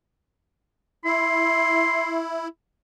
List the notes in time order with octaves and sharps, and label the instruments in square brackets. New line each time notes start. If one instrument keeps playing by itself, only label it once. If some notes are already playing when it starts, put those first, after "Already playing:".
[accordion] E4 [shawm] C6